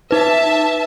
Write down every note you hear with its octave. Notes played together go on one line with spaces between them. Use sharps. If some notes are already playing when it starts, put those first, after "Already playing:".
D#4 B4 E5 A5